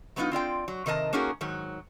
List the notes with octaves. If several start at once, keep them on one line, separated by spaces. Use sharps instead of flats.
F#3 A3 B3 C#4 D#4 F4
C4 F4 D5 G5
F#3
C3 D#3 A#4 D#5 A5
A#3 C#4 D#4 F#4 G#4 A#4
G#2 D#3 F#3